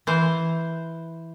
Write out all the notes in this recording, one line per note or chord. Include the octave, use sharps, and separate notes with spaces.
E3 C5